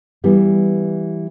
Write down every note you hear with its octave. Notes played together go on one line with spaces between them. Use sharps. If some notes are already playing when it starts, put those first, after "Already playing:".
E3 G3 B3